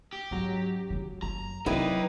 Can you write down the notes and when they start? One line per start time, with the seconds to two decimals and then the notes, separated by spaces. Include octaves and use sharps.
0.13 G4
0.31 G#2 F#3 C#4 A#5
0.90 C#2 C#3 F#3
1.23 F#1 A#5
1.66 C3 F#3 D#4 E4 B4 C#5 D5 G5